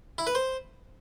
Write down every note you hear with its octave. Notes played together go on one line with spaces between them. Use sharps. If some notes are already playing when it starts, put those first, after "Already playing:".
E4
B4
C5